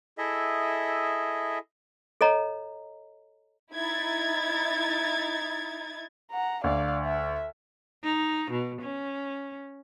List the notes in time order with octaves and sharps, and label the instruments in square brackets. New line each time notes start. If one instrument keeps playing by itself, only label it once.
[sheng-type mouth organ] E4 G#4 A4 D#5 E5
[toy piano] A4 C#5 D#5 A#5
[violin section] D#4 E4 G#6 A6
[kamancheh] F#5 A#5
[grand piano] D2 [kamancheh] D5 F5
[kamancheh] E5
[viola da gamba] D#4
B2
C#4